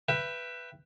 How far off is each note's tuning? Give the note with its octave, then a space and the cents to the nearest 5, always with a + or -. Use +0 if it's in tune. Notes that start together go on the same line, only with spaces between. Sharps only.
B4 +0 E5 +30 G5 +0